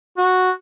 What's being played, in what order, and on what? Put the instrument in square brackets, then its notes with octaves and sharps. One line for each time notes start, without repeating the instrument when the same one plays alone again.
[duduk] F#4